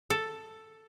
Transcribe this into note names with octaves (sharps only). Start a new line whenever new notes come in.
A4